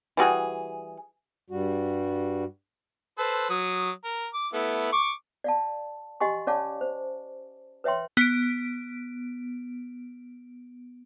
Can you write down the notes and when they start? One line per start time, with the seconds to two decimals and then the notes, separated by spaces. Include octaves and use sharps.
0.17 E3 G3 F#4 G#4
1.50 G2 G3 F#4
3.18 A4 B4 C5
3.50 F#3 D#6
4.04 A#4
4.34 D6
4.53 A3 B3 E4
4.93 C#6 D6
5.44 D5 F5 A5
6.20 G4 D#5 F#5 G#5 C6 C#6
6.47 C#4 C#5 D5 F5 A5 D6
6.81 C5
7.84 B4 C#5 E5 G5 C6
8.17 B3 D7